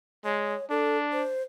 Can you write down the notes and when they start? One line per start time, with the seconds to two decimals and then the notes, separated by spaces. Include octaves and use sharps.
0.25 G#3 C#5
0.70 D4 A4
1.12 C5